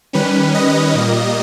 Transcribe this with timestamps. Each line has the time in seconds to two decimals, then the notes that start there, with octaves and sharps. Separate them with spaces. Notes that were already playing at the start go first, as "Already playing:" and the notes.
0.13 D#3 G3 C#4 B4
0.54 D#5
0.95 A#2 G3 A#3